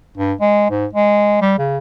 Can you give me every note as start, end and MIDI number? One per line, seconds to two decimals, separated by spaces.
0.17 0.33 43
0.40 0.70 56
0.71 0.86 44
0.93 1.39 56
1.41 1.56 55
1.59 1.78 49